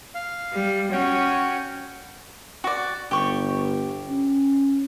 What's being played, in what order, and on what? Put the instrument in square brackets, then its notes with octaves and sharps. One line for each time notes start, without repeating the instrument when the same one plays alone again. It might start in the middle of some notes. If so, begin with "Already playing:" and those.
[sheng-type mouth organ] F5
[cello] G3
[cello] C#4 [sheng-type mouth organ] F#4 C#5 G5
[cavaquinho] F#4 D5
[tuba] G1 [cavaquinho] G4 C#6
[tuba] C#4